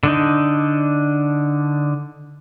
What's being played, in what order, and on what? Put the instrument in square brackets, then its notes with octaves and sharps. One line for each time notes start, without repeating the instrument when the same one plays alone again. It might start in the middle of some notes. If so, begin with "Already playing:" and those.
[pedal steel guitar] D3 D4 D#4